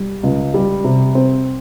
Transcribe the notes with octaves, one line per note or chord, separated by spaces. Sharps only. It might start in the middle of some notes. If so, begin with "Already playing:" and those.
Already playing: G3
C#2
G3
C3
C4